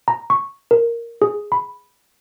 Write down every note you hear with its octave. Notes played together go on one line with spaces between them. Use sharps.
A#5
C#6
A#4
G#4
B5